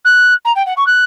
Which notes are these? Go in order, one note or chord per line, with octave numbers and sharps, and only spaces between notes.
F#6
A#5
G5
F#5
C#6
F#6